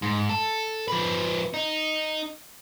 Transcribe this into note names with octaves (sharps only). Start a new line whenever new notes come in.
G#2
A4
F3 B4
D#4